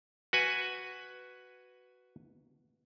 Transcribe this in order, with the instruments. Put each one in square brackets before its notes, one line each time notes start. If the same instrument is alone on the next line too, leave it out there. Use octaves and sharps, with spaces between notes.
[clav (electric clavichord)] F#4 B4 G#5